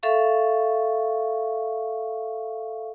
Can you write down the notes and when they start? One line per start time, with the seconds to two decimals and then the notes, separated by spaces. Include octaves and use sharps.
0.03 A4 E5 F5 C#6